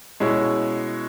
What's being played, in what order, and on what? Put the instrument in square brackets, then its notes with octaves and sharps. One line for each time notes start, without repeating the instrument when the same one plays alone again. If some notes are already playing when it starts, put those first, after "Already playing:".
[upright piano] B2 G#3 C#4 E4